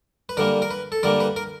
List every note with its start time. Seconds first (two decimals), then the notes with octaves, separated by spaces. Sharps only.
0.29 B4
0.37 D3 G3 A#3 A#4
0.62 A#4
0.71 B4
0.92 A4
1.03 D3 G3 A#3 A#4
1.20 B4
1.36 A#4